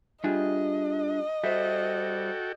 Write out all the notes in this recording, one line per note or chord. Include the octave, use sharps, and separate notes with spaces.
G3 D4 F4 G#4 D#5 E5
G3 F#4 A4 C5 E5 G5